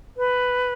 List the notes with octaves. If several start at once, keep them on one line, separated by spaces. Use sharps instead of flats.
B4